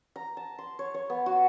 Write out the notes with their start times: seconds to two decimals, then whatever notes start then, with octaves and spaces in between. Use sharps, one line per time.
0.16 A#5
0.37 A5
0.58 C6
0.79 C#5
0.94 C#5
1.10 B3
1.26 F#4